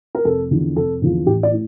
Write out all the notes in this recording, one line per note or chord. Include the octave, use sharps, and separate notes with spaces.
A#4
F1 A4
E2 D3 F3
F1 A4
E2 D3 F3
A1 G4
D5
A2